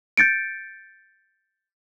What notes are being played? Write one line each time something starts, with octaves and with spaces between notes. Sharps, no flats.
G6 A6 C#7 D7